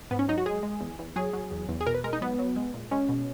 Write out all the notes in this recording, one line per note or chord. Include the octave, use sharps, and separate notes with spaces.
G#2 B3
C#4
F#3 D#4
F#4
G#3 G#4
G#3
E2
E2
F#3 G#4
F#3
E2
E2
G#4
B2 A#4
B4
G#3 A#4
D#4
F#3 B3
F#3
G#3
A#2
G#3 C#4
B2